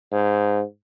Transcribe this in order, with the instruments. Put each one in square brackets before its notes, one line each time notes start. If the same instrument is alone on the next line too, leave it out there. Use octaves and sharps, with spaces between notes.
[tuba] G#2